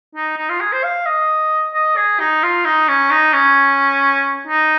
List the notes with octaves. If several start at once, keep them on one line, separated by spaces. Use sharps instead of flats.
D#4
D#4
F4
G#4
C5
F5
D#5
D#5
G#4
D#4
F4
D#4
C#4
D#4
C#4
D#4